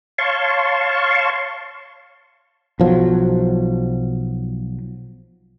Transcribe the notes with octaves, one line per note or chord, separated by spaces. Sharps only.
C#5 F5 A5 C6 C#6
B1 F3 F#3